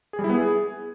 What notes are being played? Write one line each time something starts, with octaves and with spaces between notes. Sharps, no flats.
G#4
G3
E4
B3
G#4